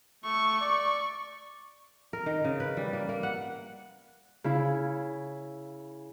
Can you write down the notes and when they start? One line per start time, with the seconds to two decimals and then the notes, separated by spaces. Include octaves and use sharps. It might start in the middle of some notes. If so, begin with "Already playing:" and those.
0.24 A3 C#6
0.61 D5
2.13 A#4
2.26 D#3
2.44 C#3
2.60 B4
2.77 G3
2.93 A#3
3.09 A#3
3.23 F#5
4.44 C#3 E4